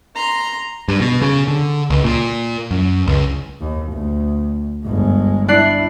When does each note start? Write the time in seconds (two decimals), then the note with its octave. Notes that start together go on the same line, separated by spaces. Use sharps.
0.15 A#5 C6
0.88 G2
1.01 B2
1.22 C#3
1.48 D3
1.90 C#2
2.04 A#2
2.71 F#2
3.07 C#2
3.61 D#2
3.93 D2
4.86 G1 G#3
5.48 D4 E4 F#6 C7